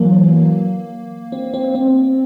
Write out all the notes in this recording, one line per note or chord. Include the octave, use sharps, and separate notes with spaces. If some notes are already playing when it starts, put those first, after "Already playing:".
Already playing: E3 F#3 A#3
C4
C4
C4